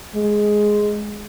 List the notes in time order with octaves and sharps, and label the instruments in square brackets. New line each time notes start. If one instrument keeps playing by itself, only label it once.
[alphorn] G#3